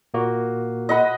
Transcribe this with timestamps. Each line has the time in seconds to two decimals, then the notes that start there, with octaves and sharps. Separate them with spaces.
0.14 A#2 A#3 F#4
0.89 D#5 F#5 B5